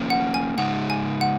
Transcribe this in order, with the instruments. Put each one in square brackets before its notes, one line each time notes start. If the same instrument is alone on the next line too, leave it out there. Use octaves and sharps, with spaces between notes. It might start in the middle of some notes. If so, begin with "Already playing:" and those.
Already playing: [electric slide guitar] F3 A#3 C#4
[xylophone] F#5
G#5
[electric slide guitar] C#3 G#3 D#4 [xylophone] F#5
[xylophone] G#5
F#5